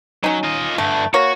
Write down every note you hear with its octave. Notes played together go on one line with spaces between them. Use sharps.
F#3 C#4 D#4
F4 D#5
G2 D3 A3
A#3 F#4 C#5